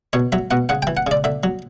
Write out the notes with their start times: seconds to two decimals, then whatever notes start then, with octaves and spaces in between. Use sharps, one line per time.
0.13 B2 C#5
0.32 F#3 E5
0.51 B2 F#5
0.69 C#3 F#5
0.82 G5
0.87 E3
0.97 F#5
1.07 C#3 D5
1.24 D3 E5
1.43 F#3